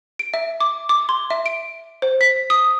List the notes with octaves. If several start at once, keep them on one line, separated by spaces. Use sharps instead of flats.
D7
E5
D6
D6
C6
E5
D7
C5
B6
D#6